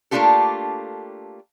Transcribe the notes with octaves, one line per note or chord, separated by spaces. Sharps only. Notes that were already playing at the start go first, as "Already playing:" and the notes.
A3 A#3 D4 F4 G4 A4